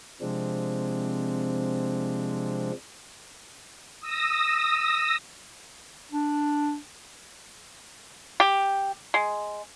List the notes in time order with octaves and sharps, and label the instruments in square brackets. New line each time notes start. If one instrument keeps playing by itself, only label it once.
[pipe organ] C3 F3 G#3 C4 D4
[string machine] D#6 E6 A#6
[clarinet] D4
[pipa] G4
G#3